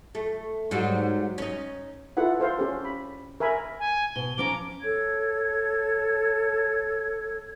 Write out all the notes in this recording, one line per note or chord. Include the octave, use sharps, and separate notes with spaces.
A3
G#2 F#3 G3
C#4 D#4
E4 F4 A4 B4 F#5
A4 C5 F5
C#4 G4 A4
B5
A#4 E5 G#5 B5
G#5
B2 G7
F3 C#4 A#5 D6
A4 C#5 G#6